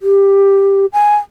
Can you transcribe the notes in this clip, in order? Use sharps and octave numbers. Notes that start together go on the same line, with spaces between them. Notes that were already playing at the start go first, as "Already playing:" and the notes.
G4
G#5